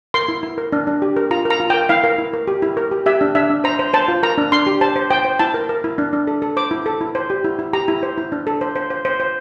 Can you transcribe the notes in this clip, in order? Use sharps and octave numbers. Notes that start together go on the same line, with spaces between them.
A#4 C6
E4
E4
A#4
D4
D4
G4
A#4
F4 A#5
A#4
A#5
F4
G5
A#4
E4 F5
A#4
E4
A#4
G4
E4
A#4
G4
G4 E5
D4
D4 E5
D4
C5 A#5
C5
C5 A5
F4
A#4 A#5
D4
D4 C6
G4
C5 A5
C5
C5 G5
C5
E4 A5
A#4
A#4
E4
D4
D4
A4
A4
C5 D6
E4
A4
E4
C5
G4
E4
E4
G4 A#5
E4
C5
E4
D4
A4
C5
C5
C5
C5
C5